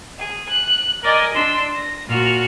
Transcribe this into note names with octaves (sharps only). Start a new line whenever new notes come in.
G#4
F#6
A#4 D5 D#5 G#5
D4 C6 E6
A#6
A#2 F#4 F6